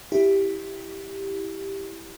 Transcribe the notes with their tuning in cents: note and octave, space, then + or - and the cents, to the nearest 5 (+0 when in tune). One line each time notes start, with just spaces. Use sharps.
E4 +0 G4 +0